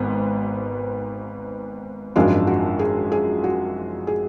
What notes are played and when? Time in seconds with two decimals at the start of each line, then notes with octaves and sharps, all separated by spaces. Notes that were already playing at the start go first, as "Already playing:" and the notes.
Already playing: G#1 G#2 B3
2.16 G#1 F#2 F3 G#3 D4 F4
2.47 F#4
2.79 G#4
3.12 G#4
3.44 F#4
4.07 G#4